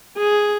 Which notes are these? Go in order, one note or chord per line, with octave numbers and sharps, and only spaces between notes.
G#4